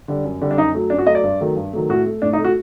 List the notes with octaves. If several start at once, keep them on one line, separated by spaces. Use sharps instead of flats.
D3 G3
F#2
D3 G3
D4
F#2 D#4
F#3 A3
F#2 D4
F#4
F#3 A3 D#5
D5
G2
D#3 F#3 A3
G2
D#3 F#3 A3
A2 F#4
A3
A2 D4
D#4
A3
F#4